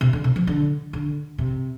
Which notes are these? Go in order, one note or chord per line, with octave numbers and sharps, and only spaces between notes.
C3
D3
C3
F3
D3
D3
C3